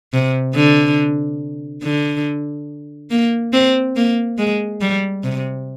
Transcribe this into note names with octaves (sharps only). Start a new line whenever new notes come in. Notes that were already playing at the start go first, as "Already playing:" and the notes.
C3
D3
D3
A#3
C4
A#3
G#3
G3
C3